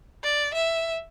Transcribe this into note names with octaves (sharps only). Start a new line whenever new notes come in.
D5
E5